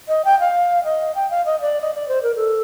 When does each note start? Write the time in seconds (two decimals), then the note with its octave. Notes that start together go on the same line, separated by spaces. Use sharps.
0.09 D#5
0.25 G5
0.40 F5
0.84 D#5
1.15 G5
1.31 F5
1.46 D#5
1.61 D5
1.81 D#5
1.94 D5
2.08 C5
2.23 A#4
2.36 A4